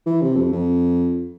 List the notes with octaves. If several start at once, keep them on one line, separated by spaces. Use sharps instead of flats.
E3
C3
F2
F2